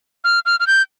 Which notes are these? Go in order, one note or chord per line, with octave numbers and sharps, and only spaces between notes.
F6
F6
F6
G6